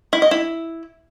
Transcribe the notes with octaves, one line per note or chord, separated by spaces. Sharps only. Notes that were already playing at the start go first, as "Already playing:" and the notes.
E4
D#5
E4